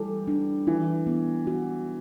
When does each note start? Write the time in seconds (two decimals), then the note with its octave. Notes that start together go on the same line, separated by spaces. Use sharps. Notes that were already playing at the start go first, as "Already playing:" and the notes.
Already playing: E3 G3 A4
0.28 D4
0.67 E3 E4
1.07 B3
1.47 F#4